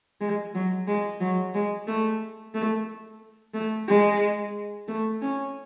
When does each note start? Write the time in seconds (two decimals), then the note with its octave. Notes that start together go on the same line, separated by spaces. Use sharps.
0.21 G#3
0.55 F#3
0.87 G#3
1.21 F#3
1.55 G#3
1.87 A3
2.54 A3
3.54 A3
3.88 G#3
4.88 A3
5.22 C#4